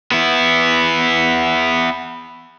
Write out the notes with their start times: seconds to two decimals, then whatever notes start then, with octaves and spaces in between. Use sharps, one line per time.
0.12 B3 E4